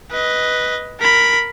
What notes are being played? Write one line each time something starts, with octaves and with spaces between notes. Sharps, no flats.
B4 D#5
A#4 B5